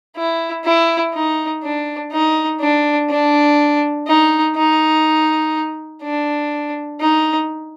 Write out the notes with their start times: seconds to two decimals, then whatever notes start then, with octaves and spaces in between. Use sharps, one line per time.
0.17 E4
0.65 E4
1.14 D#4
1.64 D4
2.12 D#4
2.61 D4
3.10 D4
4.08 D#4
4.56 D#4
6.03 D4
7.01 D#4